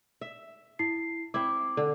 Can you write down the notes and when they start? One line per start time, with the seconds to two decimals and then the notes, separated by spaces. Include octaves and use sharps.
0.21 E5
0.79 E4 C7
1.34 C4 E4 D6
1.77 D3